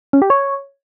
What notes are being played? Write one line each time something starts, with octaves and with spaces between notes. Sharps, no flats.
C#4
G4
C#5